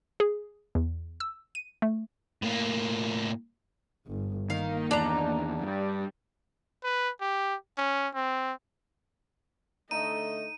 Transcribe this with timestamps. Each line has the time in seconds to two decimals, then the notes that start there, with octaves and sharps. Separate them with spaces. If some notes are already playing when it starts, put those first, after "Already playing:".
0.20 G#4
0.75 E2
1.20 E6
1.55 D#7
1.82 A3
2.43 A2 A#3
4.08 G1
4.50 D#3 A#3 D#4 F5
4.91 E2 D#3 D4 A#5
5.61 G2 G3
6.84 B4
7.21 G4
7.78 C#4
8.14 C4
9.91 D3 A3 D#4 D#5 D#7